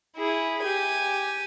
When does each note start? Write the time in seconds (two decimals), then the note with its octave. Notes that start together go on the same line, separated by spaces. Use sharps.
0.16 E4 G#4
0.62 G4 G#5